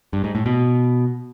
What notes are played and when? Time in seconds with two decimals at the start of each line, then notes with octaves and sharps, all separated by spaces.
0.13 G2
0.24 G#2
0.35 A2
0.46 B2